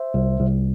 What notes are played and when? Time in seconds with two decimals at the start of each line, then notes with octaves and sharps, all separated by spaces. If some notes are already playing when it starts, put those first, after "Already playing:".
Already playing: C5 E5
0.14 C2
0.40 C2